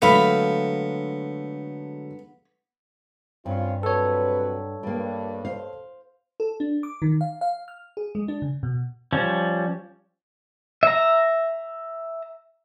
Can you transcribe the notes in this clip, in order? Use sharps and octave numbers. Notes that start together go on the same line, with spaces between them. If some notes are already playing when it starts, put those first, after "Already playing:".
D3 F#3 G#3 A3 B3 F5 B5
G2 C4 C#4 F4
C3 F#3 A4 B4 C#5
G2 G3 A#3
C5 F5
A4
D4
D6
D#3
F5
F5
F6
G#4
G#3
D4
C#3
B2
F3 G3 C#4
E5 A#5